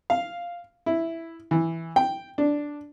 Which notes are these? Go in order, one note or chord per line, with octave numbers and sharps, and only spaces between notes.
F5
E4
E3
G5
D4